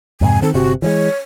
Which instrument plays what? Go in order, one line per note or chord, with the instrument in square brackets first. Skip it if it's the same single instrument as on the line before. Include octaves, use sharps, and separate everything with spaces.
[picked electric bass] F2 G#2 C3 [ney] G#5
[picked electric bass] D#3 C4 [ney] A4
[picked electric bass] G1 C3 [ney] F#4
[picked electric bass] E3 F3 G#3 [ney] C#5